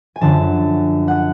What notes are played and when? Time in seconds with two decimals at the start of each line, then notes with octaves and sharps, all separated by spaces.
0.16 G#5
0.21 F#2 D3 F3 A5
1.08 F#5